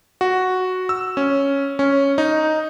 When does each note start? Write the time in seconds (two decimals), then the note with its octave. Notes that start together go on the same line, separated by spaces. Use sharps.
0.21 F#4
0.89 E6
1.17 C#4
1.79 C#4
2.18 D#4